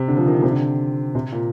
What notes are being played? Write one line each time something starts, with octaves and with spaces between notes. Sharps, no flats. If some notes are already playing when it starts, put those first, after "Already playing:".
Already playing: C3
D3
F3
D#3
D3
C3
D3
C3
A#2